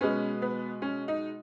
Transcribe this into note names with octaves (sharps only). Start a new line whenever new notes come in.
B2 G#3 B3 C#4
B3
C#4
D#4